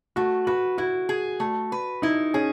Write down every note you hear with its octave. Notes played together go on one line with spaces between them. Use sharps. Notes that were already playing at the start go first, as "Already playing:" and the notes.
A3 F#4
F#4 B4
E4 F#4
G#4
A3
B4
D#4 E4
C#4 G#4